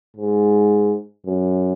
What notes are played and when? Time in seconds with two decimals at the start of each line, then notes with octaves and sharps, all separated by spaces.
0.17 G#2
1.26 F#2